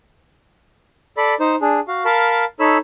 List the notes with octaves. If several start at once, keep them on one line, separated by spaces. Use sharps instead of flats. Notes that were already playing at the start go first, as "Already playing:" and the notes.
A4 D5 B5
D#4 C5
D4 G#4
F#4 F5
A#4 F5 A5 B5
D#4 A4 C#5 B5 E6